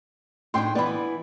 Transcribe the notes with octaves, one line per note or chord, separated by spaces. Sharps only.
A2 D4 D#4 G5 C6
E3 B3 D5 B5